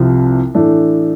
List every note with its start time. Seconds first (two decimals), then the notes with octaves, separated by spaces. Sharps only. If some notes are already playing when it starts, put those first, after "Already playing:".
Already playing: C2 C3 F3
0.55 A2 E3 A3 D4